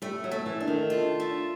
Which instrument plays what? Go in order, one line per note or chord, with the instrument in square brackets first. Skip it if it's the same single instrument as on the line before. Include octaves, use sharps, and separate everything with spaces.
[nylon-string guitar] G3 [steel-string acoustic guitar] A3
[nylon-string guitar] F#3
[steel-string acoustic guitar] A3
[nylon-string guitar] E3
[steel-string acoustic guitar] D4
[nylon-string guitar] D#3
[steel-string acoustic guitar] F4
A3